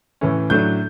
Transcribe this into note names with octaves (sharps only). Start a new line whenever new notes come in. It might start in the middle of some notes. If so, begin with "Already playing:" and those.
A2 E3 A3 C#4
A2 F#3 A3 D4 G6